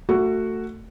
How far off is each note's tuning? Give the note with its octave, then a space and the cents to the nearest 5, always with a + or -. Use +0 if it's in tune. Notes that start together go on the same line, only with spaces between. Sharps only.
A3 +20 F#4 +0